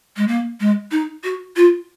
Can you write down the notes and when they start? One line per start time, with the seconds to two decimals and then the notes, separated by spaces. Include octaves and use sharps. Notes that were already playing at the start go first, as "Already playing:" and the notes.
0.17 G#3
0.28 A#3
0.60 G#3
0.91 D#4
1.24 F#4
1.56 F4